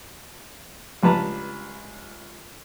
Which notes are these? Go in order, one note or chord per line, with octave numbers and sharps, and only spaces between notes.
C#2 G2 B4 A5 A#5